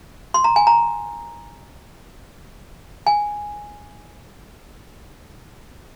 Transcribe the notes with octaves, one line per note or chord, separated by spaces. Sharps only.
C6
A#5
G#5
A#5
G#5